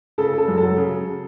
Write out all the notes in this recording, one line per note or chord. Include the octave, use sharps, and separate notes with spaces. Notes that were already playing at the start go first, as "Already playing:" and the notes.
C#3 A4
C#3 A4
F#2
A4
F#3
C#3